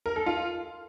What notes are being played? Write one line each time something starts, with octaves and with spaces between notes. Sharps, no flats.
A#4
A4
F4